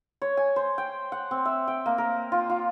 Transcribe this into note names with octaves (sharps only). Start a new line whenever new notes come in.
C#5
G#5
C5
G5
F#5
C4
E5
G5
A#3
A#4
F4
F4